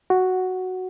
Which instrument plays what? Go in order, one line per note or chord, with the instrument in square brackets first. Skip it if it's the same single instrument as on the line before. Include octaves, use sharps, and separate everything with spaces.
[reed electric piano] F#4